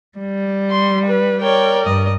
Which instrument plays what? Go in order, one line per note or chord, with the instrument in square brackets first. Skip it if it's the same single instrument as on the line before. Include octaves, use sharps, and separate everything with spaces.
[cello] G3
[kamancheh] C6
B4
[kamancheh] A#4 D5 [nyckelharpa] C#5 G5
[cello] G2 [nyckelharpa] D#5